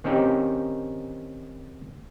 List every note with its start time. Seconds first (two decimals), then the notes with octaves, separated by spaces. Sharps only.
0.04 D#3 C4 C#4 D#4 G4